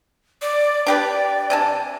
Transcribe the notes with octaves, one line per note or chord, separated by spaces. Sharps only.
D5
D4 G4 B4 D5
C3 G#5 A5